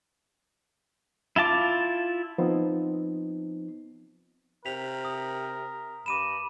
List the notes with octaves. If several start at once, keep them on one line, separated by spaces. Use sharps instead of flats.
E4 F4 A5 D6
F3 B3 C4 D#4
C3 A#4 B6 F7
D#6
G2 B5 D6 D#7 E7